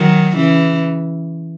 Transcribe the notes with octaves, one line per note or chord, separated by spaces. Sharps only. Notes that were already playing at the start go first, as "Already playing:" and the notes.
Already playing: D#3 F#3
C#3 E3